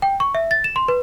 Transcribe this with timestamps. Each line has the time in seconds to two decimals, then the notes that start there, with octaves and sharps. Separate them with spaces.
0.02 G5
0.20 C#6
0.35 E5
0.51 A6
0.64 E7
0.76 C6
0.88 B4